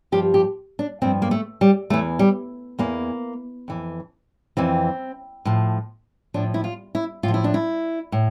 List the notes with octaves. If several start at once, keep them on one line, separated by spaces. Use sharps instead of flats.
G2 F3 G4
G4
D4
G2 F3 C4
A#3
A3
G3
E2 E3 A3
G3
E2 E3 A#3
F2 E3
F2 E3 C4
A2 F3
A2 F3 D4
E4
F4
E4
A2 F4
F3
E4
D4
E4
A2